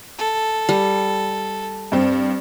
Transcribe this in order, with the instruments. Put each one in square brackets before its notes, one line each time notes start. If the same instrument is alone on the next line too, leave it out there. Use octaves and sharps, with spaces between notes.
[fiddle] A4
[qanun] G3
[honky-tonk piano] G2 C4